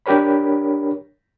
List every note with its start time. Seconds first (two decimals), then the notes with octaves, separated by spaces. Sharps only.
0.06 D4 G4 A#4 C#5 B5